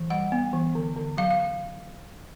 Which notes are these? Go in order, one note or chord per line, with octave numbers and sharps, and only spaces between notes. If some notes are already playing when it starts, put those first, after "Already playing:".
Already playing: E3
G3 F#5
B3
E3
D3
D3
F#3 F5
F5